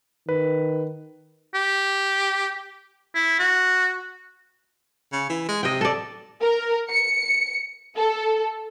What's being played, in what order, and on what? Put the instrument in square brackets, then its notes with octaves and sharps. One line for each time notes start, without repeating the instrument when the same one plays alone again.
[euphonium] D#3 [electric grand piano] B4
[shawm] G4
E4
F#4
[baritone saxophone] C#3
E3
G#3
[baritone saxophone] C3 [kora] D#5 G5
[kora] A4 D5
[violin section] A#4
C#7
A4